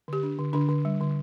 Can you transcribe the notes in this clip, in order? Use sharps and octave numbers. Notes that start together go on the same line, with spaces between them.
D3 G4
D4
D3
D3 D4
D3
G3
D3